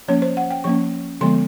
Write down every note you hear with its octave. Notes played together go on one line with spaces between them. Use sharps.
F3 A#3 C#4 C#5
C5
F#5
G5
F3 A#3 C#4 C#6
D3 F3 G#3 B3 C6